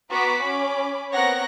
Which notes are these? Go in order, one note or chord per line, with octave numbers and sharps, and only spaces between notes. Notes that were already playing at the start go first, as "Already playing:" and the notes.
B3 F#4 B4 A#5 D6 B6
C#4 G#5 B5 D6
B3 C4 A#4 C#5 F#5 A#6